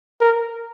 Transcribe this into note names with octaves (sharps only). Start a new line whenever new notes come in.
A#4